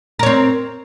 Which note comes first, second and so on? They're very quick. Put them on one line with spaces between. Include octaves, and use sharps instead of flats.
A#4 C#5 C4